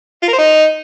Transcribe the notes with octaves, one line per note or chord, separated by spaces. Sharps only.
F4
A#4
C5
D#4